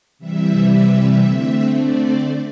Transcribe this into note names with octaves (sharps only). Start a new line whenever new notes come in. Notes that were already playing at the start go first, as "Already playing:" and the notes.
C3 E3 G3 E5
E5
D3 A3 C4
D5